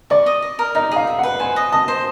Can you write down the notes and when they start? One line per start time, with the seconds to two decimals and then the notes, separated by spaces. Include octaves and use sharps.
0.10 D5 C#6
0.26 D#5
0.42 D#5
0.59 A#4
0.75 D#4 D#5
0.91 G#4 F5
1.07 E5
1.19 B4 F#5
1.40 C5 G#5
1.56 D#5
1.72 D#5 A5
1.88 C5